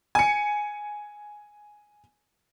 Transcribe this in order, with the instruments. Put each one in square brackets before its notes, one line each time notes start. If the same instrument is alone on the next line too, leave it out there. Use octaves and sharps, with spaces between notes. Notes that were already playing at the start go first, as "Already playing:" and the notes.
[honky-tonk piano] G#5 C#7